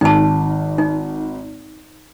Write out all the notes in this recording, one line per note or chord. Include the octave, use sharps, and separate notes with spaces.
G#1 D#3 D#4 A5
D#4